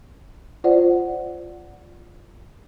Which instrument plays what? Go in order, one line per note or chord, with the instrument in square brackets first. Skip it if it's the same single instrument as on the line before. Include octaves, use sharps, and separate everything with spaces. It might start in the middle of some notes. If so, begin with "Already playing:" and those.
[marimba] F4 C5 D5 F#5